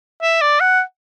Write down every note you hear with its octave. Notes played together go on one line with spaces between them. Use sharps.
E5
D5
F#5